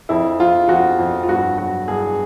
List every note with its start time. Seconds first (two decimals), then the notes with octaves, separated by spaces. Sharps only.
0.09 F2 E4
0.40 F3 F4
0.69 F2 F#4
0.99 F2
1.23 F4
1.28 G2 F#4
1.58 F#3 F#4
1.88 G2 G#4